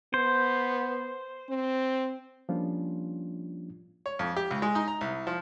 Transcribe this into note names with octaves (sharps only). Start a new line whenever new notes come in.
B3 C5
C4
F3 G3 A#3 C#4 D4 F4
C#5
F2
G4
C#2
G#3
D#4
A#5
C2
F3